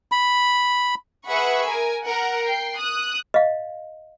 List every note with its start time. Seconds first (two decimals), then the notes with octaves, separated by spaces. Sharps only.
0.12 B5
1.29 G#4 B4 E5 F#5 B5 C#6
1.66 A#4 G#5
2.05 A#4 F#5
2.47 G5 C7
2.78 D#6 F#6
3.34 D#5 F5